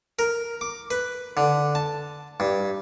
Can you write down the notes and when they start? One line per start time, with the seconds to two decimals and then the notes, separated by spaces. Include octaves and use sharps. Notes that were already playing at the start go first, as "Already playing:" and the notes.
0.19 A#4
0.61 D6
0.91 B4
1.37 D3
1.75 A5
2.40 G2